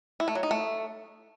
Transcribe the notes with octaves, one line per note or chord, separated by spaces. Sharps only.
E4
A3
F#3
D#4
A3